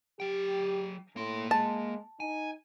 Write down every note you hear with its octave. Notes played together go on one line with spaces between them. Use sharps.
F#3 G4 G5
A2 A#3 C6
G#3 A5
D#4 G#5